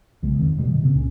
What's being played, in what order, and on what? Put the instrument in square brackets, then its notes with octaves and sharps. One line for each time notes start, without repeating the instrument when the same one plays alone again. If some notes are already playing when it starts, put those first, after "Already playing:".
[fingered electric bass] B1 C#3 G#3
E1 D#3 C4
E1 A1 B2 G3
G1 C3 D#3
A#2 C#3 C4
C2 A#2 C#4